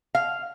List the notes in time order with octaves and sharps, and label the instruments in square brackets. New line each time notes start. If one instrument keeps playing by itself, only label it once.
[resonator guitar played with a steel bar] F5